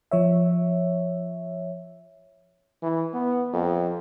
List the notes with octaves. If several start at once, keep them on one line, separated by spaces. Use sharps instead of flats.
F3 C#5 E5
E3
B3
F2